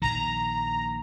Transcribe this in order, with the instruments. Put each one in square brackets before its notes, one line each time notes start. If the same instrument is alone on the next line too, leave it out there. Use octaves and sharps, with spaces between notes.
[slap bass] A#1 D#3 [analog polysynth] A#5